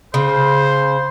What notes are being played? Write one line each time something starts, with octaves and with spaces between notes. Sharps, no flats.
C#3 C5